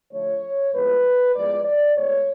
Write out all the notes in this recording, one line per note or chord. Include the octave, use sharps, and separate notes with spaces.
D3 F3 A3 C#5
A2 F3 G#3 B3 B4
A2 F3 G#3 B3 D5
D5
A2 G#3 B3 C#5